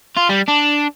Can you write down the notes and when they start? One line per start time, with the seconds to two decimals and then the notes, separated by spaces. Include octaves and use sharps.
0.17 F4
0.29 G3
0.48 D4